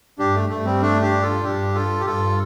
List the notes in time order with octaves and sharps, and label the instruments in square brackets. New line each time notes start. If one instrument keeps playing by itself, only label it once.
[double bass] G2 [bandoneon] D4 G4
[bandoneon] A3
[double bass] G2 [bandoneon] A3
[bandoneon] G3 C4
A3 D4
D4 G4
F4 A4
[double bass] G2 [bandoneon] D4 G4
[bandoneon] F4 A4
G4
[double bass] G2 [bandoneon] F4 A4